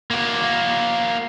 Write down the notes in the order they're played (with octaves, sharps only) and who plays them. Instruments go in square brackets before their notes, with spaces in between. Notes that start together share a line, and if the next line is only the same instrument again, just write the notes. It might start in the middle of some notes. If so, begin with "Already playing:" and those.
[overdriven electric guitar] A#3 F#4